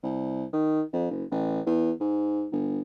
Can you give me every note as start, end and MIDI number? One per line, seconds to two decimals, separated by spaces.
0.03 0.45 36
0.53 0.82 51
0.93 1.08 41
1.11 1.24 30
1.31 1.61 33
1.66 1.91 40
2.00 2.47 44
2.52 2.81 31